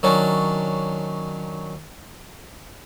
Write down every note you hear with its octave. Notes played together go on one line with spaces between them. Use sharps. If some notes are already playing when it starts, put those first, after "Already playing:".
D#3 F#3 C#4 D4